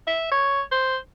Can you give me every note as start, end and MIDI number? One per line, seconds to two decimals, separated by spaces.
0.07 0.30 76
0.31 0.62 73
0.72 0.97 72